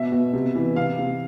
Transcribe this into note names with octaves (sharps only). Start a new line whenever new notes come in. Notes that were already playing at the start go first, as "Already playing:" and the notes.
Already playing: B2 E5
B2
C3
E3
C3 F5
C3